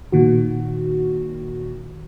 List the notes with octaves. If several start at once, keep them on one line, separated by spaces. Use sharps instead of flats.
A#2 D#3 F#4